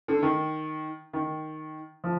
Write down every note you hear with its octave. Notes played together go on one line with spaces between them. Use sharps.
D3
D#3
D#3
F3